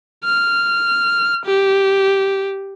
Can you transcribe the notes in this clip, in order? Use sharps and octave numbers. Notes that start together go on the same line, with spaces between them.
F6
G4